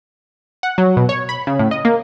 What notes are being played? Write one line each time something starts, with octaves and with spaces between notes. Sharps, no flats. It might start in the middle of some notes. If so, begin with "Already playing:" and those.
F#5
F#3
B2
C#5
B5
C#3
A2
D#5
A#3